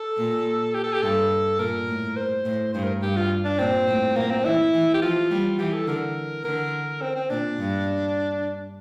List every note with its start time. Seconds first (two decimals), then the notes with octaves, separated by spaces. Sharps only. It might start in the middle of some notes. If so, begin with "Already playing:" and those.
Already playing: A4
0.17 A#2
0.74 G4
0.84 A4
0.93 G4
1.02 G2 A4
1.59 A#2 A#4
1.88 A2
2.17 C5
2.45 A2
2.74 G2 C5
2.83 A#4
3.02 G2 G4
3.17 F4
3.45 D4
3.59 A#2 C4
3.88 A2
4.16 A#2 A#3
4.30 C4
4.45 E3 E4
4.73 E3
4.94 G4
5.02 F3 F4
5.31 G3
5.59 E3 G4
5.73 A4
5.87 D3 A#4
6.45 D3 A#4
7.02 C4
7.16 C4
7.30 A#2 D4
7.59 G2